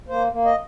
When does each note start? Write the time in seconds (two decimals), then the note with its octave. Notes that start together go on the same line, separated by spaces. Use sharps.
0.08 A#3 C5
0.32 A#3
0.45 D#5